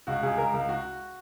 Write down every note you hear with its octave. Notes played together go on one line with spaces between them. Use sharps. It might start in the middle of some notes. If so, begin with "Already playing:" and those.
C#2 F#4
C#2 G#4
C#2 A#4
C#2
F#4